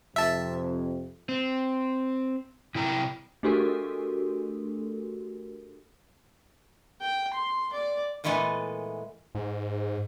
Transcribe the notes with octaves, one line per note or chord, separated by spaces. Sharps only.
F2 C3 E5 A5
C4
C3 E4 G5 A#5
A3 D4 F#4 G4 A4 A#4
G5
C6
D5
A#2 E3 G#3 A3 B3 A4
G#2